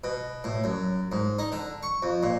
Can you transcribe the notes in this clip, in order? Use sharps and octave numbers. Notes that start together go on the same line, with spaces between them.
B2
A2
F#2
G#2
D#4
D3
C#6
F2
A#2